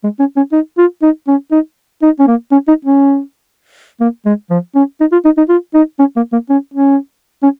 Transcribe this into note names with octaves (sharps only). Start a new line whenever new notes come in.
G#3
C#4
C#4
D#4
F4
D#4
C#4
D#4
D#4
C#4
A#3
C#4
D#4
C#4
A#3
G#3
F3
C#4
D#4
F4
D#4
D#4
F4
D#4
C#4
A#3
A#3
C#4
C#4
C#4